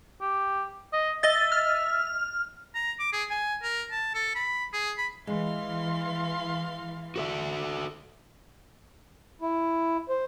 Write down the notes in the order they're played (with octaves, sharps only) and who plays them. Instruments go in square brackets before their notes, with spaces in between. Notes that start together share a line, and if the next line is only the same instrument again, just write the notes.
[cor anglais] G4
D#5
[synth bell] D#5 A6 [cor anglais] E5
[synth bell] F6
[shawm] A#5
D6
G#4
G#5
A#4
A5
A4
B5
G#4
B5
[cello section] E3 [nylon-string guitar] G#3 [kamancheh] F5 C6
[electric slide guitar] F#4 A4 E5
[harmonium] E4
C5